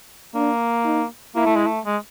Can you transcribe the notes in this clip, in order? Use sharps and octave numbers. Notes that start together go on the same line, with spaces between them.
A#3 D4
D#4
A#3 E4
A3
G#3
A3
G#3